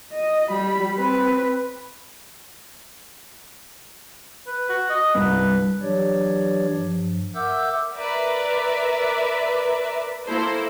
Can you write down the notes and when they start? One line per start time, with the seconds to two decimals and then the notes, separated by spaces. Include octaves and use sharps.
0.12 D#5
0.49 G3 B5
0.94 C4 B4
4.47 B4
4.69 F#4
4.90 D#5
5.15 C2 G2 B4
5.82 E3 F#3 D4 G4 C#5 D5
6.76 G2 F3
7.35 A#4 E5 F#5 D6 E6 G6
7.96 A#4 B4 D5 E5
10.25 A#3 E4 A4 C5